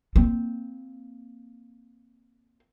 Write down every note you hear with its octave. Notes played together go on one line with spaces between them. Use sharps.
A#3 C4